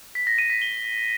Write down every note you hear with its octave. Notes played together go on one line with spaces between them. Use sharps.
B6
A#6
D#7
B6
G7